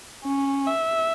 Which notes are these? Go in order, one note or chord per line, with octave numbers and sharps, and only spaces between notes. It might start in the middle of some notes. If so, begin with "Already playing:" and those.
C#4
E5